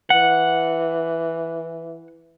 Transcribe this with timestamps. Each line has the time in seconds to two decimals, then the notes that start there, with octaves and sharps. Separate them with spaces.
0.10 E3 F#5